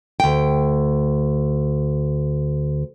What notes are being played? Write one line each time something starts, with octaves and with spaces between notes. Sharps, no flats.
D2 G5